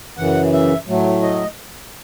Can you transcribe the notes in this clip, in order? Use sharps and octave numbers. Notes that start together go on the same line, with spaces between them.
F#2 C#3 E3 F#5
E5
A2 F#3 A3
D#5